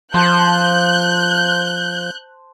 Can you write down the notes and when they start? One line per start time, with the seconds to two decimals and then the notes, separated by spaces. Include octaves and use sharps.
0.14 F3 C5 A5 F#6 G6